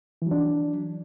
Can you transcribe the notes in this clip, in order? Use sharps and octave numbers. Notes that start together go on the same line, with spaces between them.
E3 F#3 D4